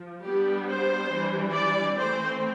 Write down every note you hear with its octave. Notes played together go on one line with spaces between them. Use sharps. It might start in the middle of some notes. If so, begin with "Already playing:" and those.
Already playing: F3
G3 B3 D4 G4
C5
E3 G3 D4
D5
E3 A3 C4 C5